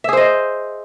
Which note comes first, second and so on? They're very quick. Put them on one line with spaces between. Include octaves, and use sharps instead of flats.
E5 G#4 C5 D#5